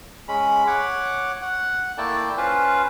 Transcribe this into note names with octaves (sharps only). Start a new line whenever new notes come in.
G#3 C#4 B5
C#5 F#5 D6
F#5
A3 A#3 E4 D5 G5 A5
C#4 F4 B4 C5